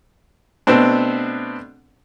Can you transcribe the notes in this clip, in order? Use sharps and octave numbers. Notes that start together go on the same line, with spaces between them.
B2 A3 B3 C4 D4